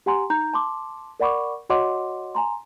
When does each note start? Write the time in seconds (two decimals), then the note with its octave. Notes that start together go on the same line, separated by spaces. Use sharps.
0.06 G4 F#5 G#5 A#5 C6
0.30 D#4 A#5 G6
0.54 A5 C6 D6
1.20 A#4 D5 F#5 B5 C#6 D6
1.70 F#4 C#5 D#5 F#5 C6 D6
2.35 G#5 A#5 C6